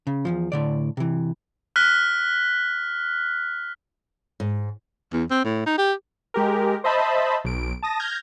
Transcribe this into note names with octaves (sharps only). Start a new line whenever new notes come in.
C#3
E2 G#2 F3
A2 D3 D5
C3 E3
F6 F#6 B6
G#2
E2
C4
A2
D#4
G4
G#3 G4 A#4
C5 D#5 E5 A5 B5
B1 D7
A5 D#6 A#6
F6 G6 G#6 A#6